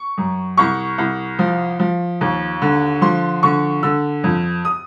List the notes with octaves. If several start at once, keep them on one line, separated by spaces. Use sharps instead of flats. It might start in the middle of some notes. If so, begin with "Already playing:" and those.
Already playing: C#6
F#2
C2 C#6
C2
F3
F3
D#2
D3
F3 C6
D3 C#6
D3 E6
F2
D#6